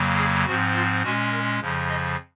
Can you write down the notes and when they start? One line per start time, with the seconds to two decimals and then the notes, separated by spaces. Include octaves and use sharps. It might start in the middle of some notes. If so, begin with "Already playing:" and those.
Already playing: F2 C#3 F#3 A#3
0.17 G#4
0.45 G#2 F3 C4 F#4
0.73 F4
1.02 A#2 G#3 C#4 F#4
1.31 A#4
1.59 F2 C#3 F3
1.88 D#5